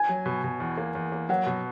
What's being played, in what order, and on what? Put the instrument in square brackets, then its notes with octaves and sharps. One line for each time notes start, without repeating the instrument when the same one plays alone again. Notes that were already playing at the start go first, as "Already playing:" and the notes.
Already playing: [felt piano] G#5
[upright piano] F#3
B2
B2
E2
A#3
E2
A#3
[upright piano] F#3 [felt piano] F#5
[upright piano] B2